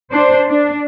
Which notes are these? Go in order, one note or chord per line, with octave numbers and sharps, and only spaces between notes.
D4 C5
D4